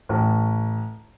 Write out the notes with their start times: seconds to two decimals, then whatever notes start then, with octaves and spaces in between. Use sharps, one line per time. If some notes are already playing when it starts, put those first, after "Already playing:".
0.09 A1